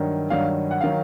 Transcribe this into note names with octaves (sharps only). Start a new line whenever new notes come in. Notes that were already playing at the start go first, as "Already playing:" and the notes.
Already playing: G2 D#3 F#3
G2 D#3 F#3 F5
F#5
D#3 F#3 F5